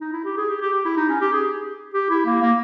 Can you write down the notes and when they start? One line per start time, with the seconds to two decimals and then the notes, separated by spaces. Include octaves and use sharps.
0.01 D#4
0.13 E4
0.25 G4
0.37 G#4
0.49 G4
0.61 G4
0.73 G4
0.85 E4
0.97 D#4
1.09 C#4
1.21 G4
1.33 G#4
1.94 G4
2.10 E4
2.25 A#3
2.42 A#3